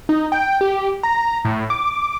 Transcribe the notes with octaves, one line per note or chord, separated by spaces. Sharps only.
D#4
G5
G4
A#5
A2
D6